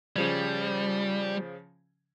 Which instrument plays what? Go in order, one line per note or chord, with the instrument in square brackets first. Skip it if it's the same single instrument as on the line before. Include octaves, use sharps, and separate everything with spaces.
[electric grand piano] C#3 F3 G#6 [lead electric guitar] G3